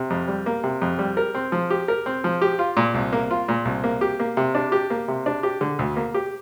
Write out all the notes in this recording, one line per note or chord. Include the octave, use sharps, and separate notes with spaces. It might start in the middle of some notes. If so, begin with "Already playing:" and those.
Already playing: C3
F2
G3
A#3
C3
F2
G3
A#4
C4
F3
G4
A#4
C4
F3
G4
F4
A#2
C2
A#3
F4
A#2
C2
A#3
G4
A#3
C3
D4
G4
A#3
C3
D4
G4
D3
D2
A#3
G4